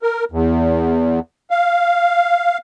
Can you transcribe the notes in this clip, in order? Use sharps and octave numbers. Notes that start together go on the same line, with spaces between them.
A#4
E2
F5